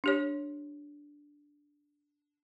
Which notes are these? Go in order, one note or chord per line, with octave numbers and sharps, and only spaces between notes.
D4 G4 C#5